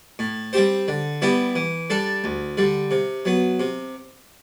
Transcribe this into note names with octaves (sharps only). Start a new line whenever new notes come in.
A2
G3 C4 G4 C5
D3
G3 B3 E4 G4
E3
G3 D4 A4
D2
D3 G3
C3
F#3 B3
C3